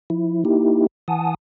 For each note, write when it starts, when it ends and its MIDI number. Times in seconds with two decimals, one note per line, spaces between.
0.10 0.44 53
0.10 0.44 64
0.45 0.87 58
0.45 0.87 63
0.45 0.87 64
0.45 0.87 67
1.08 1.34 52
1.08 1.34 78
1.08 1.34 80
1.08 1.34 81
1.08 1.34 87